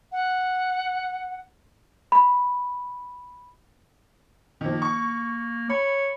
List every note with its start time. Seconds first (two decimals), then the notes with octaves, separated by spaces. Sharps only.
0.12 F#5
2.12 B5
4.61 D#3 F3 A#3
4.82 C#6
5.70 C#5 B5